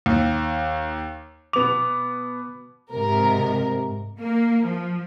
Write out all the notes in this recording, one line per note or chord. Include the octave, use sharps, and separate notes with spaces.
D#2
B2 B3 D6 F7
G#2 C3 A#4
A#3
F3